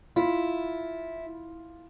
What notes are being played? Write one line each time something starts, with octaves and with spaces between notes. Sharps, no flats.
E4 F4